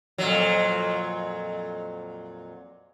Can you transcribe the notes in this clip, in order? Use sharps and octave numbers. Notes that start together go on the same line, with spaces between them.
F2 A#2 F#3